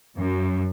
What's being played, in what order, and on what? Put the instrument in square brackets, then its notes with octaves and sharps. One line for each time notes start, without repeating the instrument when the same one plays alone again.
[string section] F#2